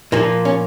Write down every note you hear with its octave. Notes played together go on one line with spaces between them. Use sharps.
A#2 F3 A#3
C#4